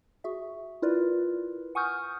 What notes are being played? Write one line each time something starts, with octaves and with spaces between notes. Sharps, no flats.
F#4 G#4 E5
E4 F4 A#4 B4 D5
F#5 G#5 C#6 D#6 F6 G6